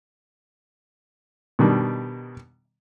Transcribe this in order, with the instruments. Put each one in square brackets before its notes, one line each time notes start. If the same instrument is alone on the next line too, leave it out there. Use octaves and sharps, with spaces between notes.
[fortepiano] B2 D#3 G3 D4